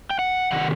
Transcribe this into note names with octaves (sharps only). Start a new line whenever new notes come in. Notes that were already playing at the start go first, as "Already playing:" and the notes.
G5
F#5
C3 D#3 F#5